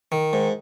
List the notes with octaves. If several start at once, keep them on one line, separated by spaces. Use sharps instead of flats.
D#3
G#2